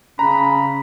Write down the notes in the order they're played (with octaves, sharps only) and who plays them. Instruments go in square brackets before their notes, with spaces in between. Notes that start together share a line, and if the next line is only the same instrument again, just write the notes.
[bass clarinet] C#3 [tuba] C#4 [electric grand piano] A#5 [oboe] B5